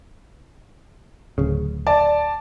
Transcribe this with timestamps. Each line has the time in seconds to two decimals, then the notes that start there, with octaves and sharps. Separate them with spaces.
1.38 D1 C#3
1.87 D5 A5